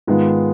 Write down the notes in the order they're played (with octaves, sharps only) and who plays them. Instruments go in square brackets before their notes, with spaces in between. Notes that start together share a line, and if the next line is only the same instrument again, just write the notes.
[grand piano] G#2 D#3 G#3 B3 F4